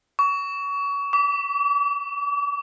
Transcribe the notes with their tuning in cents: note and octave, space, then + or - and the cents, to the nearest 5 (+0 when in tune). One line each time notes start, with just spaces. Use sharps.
C#6 +30
D6 -40